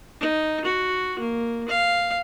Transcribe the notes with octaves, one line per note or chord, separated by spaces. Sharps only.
D#4
F#4
A#3
F5